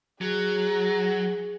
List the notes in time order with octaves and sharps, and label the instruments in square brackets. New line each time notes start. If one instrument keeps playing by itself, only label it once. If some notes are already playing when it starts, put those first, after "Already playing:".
[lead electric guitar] F#3 [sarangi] G#4